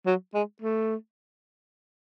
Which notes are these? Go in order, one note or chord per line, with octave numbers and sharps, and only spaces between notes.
F#3
G#3
A3